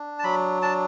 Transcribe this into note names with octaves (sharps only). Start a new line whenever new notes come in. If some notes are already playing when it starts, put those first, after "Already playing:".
Already playing: D4
A5
F#3 B5
D4 A5